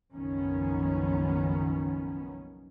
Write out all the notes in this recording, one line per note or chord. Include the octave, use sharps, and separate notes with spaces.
F#1 B1 D#3 F3 B3 C#4